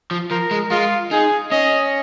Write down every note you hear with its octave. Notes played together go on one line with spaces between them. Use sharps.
F3
F3 A#4
G#3
G#3 F4
D#4 G#4
C#4 D#5